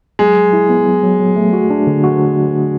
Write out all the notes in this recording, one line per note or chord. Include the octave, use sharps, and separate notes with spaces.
F#3 G#3
F#3
E4
B3
F#3
F#3
F#3
A3
F#4
D4
D3
F#4